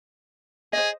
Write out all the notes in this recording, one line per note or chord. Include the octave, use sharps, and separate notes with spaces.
G#4 C5 D#5